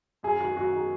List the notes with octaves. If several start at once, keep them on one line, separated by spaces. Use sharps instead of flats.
F#2 G#4
D#3 G#3 F#4
F#2 F#4
D#3 G#3